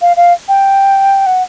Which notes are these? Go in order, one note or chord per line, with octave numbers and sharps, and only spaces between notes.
F5
F5
G5
F#5